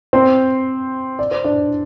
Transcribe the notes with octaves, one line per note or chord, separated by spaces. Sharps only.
C4 C5
D5
C5
D4 D5